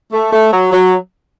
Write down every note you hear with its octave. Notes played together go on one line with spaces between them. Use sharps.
A3
A3
F#3
F#3